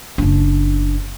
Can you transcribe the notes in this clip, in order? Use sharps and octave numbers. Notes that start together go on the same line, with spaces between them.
F#1 D4